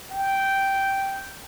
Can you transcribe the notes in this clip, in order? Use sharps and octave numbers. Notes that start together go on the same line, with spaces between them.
G5